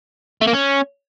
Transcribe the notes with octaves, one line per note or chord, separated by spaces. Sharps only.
A3
A#3
C#4